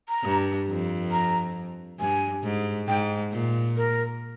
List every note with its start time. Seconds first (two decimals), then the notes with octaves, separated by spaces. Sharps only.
0.09 A#5
0.24 G2
0.68 F2
1.12 A#5
1.99 G2 G#5
2.43 G#2
2.88 G#2 G5
3.32 A#2
3.76 A#4